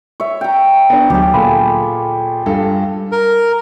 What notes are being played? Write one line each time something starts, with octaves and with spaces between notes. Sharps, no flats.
C#5 E5
G5 A#5
B3 D4
D2 F#3 G4 G#4
A#2 F4 A4 B5
G2 A4 F5
A#4